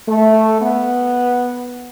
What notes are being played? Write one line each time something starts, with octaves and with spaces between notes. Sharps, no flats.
A3
B3